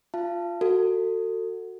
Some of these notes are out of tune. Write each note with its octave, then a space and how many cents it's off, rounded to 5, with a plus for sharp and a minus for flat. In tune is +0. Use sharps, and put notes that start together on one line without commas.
F4 +0 F5 -35 A5 +0
F#4 +0 A4 +30